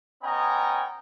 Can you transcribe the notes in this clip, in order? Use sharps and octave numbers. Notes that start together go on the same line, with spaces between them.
B3 C#4 D#5 G5 G#5 A#5